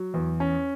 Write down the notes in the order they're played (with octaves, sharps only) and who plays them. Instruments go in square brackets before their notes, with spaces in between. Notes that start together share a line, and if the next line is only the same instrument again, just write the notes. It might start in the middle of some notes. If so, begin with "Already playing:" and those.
Already playing: [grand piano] F#3
E2
C#4